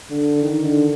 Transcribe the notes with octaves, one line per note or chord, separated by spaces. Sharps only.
D3
D#3
D3